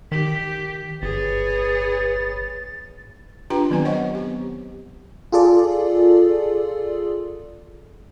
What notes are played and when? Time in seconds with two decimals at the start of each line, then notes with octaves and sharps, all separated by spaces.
0.12 D#3 G4 B6
1.02 G1 G#4 B4 C#5 A6
3.50 D4 F4 G4 B4 G5 A#5
3.70 D#3 F#3 B3 C4 G#5
3.85 C5 C#5 D#5 F#5 C#6
4.15 G4
5.32 F4 G#4 A4 D5